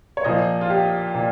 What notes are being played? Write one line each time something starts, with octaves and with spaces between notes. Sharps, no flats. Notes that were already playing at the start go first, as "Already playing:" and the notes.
C#5
A#2 F3 C5 D#5
F4
G4
A#2